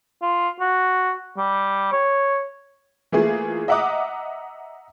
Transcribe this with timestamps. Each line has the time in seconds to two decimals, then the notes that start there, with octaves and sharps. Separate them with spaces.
0.22 F4
0.60 F#4
1.37 G3
1.92 C#5
3.12 E3 A3 A#3 F4 G#4
3.68 D#5 E5 F#5 A#5 D6 D#6